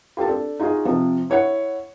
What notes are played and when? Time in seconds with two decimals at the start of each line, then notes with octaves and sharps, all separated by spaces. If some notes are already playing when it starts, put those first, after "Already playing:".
0.17 F4 G4 A4 A5
0.29 D4 A4
0.60 D#4 F4 F#4 G#4 D#5
0.85 C3 F3
1.30 E4 C#5 F#5 C#7